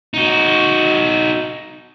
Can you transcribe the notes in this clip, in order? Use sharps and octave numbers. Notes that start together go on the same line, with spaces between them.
D#4 F#4